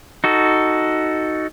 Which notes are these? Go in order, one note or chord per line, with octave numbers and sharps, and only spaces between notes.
D#4 F#4 A4